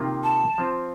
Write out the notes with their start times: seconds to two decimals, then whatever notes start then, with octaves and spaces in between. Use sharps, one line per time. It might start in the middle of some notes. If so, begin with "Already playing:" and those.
Already playing: C3 D#3 A#3 F4
0.24 A5
0.58 F3 C4 F4